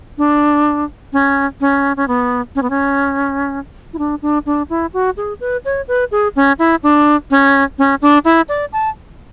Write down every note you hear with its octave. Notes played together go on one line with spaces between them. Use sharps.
D4
C#4
C#4
C#4
B3
C#4
B3
C#4
E4
D4
D4
D4
E4
F#4
G#4
B4
C#5
B4
G#4
C#4
E4
D4
C#4
C#4
D4
E4
D5
A5